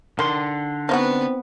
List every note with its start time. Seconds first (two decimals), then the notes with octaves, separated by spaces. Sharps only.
0.19 D3 D#3 C6
0.89 B3 C4 D#4 F4 F#4 B4